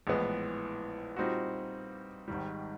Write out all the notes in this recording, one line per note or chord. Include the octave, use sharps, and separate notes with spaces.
A#1 A2 E3 G#3 B3
A#2 G3 C4 D#4 F#4
G#1 G#2 D#3 G3